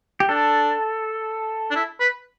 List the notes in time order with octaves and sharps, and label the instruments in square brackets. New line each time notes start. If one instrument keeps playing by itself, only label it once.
[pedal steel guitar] G4
[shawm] D4 [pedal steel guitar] A4
[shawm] D4
E4
B4